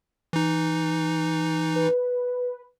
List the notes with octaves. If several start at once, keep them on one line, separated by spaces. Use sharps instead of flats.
E3 D#4
B4